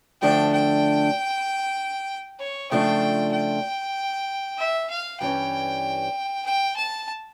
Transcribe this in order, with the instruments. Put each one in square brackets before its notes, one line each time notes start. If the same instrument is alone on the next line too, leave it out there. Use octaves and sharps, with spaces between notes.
[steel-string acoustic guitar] D2 D3 F3 A3 D4 [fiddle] G5
[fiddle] G5
C#5
[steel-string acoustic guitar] C#3 F3 A3 D4 F4 [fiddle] G5
[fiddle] G5
E5
F5
[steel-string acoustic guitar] G2 E3 G3 C#4 [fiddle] G5
[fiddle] G5
A5